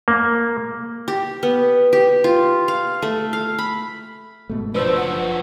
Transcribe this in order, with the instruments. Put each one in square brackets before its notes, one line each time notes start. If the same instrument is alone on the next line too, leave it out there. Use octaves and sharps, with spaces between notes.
[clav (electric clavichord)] A#3
[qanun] G4
B3
G4
F4
F5
A3
F5
B5
[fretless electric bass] G#2 B2 A3
[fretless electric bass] F#1 D4 [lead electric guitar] F3 F#3 [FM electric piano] B4 E6 [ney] C5
[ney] F#5